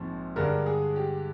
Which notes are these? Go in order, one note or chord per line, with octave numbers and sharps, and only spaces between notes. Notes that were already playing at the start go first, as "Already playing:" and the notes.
Already playing: A#1 G#2 F3 C4
G2 D3 G#3 D4 A#4
G#4
G4